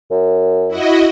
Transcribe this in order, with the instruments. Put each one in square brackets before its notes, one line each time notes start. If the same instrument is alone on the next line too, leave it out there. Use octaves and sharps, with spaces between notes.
[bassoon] F#2
[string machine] E4 F#4 D#5